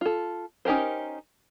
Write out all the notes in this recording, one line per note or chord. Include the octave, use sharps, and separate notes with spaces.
F4 A4
C#4 D#4 G4 A#4 C5